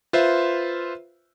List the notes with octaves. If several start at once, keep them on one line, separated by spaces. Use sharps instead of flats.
F4 B4 C5 E5